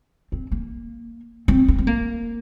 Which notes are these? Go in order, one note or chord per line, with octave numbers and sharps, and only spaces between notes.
C4
A#3
C4
C4
C4
A#3